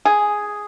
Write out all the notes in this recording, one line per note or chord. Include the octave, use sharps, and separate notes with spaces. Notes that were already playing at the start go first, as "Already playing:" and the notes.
G#4